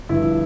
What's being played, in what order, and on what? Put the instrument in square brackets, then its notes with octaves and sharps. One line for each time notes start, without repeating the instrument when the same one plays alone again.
[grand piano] G1 G2 F3 E4